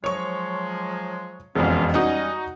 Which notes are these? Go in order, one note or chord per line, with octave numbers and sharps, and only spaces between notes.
F3 F#3 G#3 C#5 C#6
E1 F2 B3 C#4 F4
G3 C#4 D#4 F#4 D#5 F#5